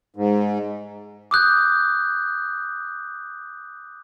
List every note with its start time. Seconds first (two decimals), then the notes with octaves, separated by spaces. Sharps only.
0.16 G#2
1.31 D6 D#6 F#6 G6